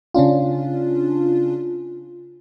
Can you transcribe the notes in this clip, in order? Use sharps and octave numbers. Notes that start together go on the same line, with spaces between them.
C#3 C#4 D4 F4